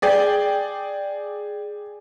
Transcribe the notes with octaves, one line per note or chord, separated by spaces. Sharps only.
G#4 D5 G5